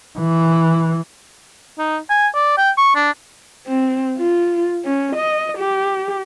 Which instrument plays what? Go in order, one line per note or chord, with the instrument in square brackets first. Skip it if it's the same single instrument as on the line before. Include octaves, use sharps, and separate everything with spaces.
[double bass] E3
[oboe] D#4
G#5
D5
G5
C#6
D4
[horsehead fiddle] C4
F4
C#4
D#5
G4